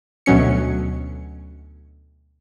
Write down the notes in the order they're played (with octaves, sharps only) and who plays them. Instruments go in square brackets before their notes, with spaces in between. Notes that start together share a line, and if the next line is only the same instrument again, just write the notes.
[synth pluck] D2 B2 F#3 C#4 C#7